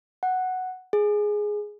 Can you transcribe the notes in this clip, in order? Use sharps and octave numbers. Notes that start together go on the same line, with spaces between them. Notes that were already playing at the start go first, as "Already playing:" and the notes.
F#5
G#4